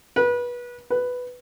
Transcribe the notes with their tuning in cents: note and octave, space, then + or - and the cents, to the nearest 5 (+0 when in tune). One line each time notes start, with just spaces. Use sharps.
B4 -25
B4 +5